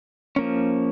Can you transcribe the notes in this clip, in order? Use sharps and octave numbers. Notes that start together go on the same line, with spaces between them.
F3 A#3 C#4